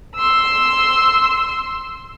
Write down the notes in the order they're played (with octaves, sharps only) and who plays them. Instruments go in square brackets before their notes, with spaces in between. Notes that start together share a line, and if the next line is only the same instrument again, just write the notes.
[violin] C6 E6